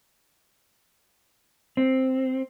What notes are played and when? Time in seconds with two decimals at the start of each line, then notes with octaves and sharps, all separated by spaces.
1.77 C4